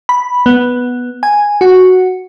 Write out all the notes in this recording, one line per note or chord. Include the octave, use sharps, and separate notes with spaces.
B5
B3
G#5
F#4